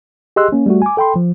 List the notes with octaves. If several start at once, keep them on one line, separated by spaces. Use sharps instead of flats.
G4 G#4 D#5 C6 E6 F#6
A#3 C#4
G3 A3 F#4
G#5 D6
A4 G5 B5 C6
F3